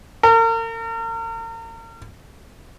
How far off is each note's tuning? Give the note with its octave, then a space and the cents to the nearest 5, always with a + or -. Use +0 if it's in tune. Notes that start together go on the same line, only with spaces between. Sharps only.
A#4 -40